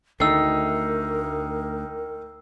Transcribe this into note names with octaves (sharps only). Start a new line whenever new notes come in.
D2 D#3 A3 D#4 A#4 E6 C7